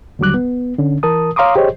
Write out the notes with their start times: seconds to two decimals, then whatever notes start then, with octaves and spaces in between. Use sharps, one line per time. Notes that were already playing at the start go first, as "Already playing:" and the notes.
0.19 D#2 D3 F#3 G3 D6 F#6
0.34 B3
0.79 D3 C#4
1.03 E3 A#4 A5 D#6
1.36 C#5 F5 A#5 C6 D6 D#6
1.56 G4 G#4 C5 C#5 D#5